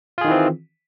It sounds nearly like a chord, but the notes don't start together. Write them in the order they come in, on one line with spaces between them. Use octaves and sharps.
F4 G#4 D#3 E3 C4